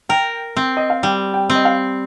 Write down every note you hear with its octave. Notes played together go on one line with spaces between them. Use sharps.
A#4 G5
C4
D#5
F5
G3 G5
G5
C4
D#5
F5